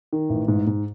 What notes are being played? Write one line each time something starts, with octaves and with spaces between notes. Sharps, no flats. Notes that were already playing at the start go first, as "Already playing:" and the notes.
D#3
A1
G#2
G#2